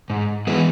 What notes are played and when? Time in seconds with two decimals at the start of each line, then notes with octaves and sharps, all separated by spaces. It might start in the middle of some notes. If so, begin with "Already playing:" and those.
0.10 G#2
0.47 E3 G#3 B3